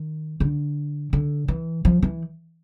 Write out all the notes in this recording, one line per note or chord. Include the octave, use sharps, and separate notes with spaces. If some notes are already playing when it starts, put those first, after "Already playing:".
Already playing: D#3
D3
D3
E3
F3
E3